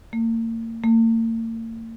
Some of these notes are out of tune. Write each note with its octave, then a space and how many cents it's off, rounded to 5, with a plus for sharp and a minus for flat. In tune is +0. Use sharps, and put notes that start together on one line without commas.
A#3 -40
A#3 -45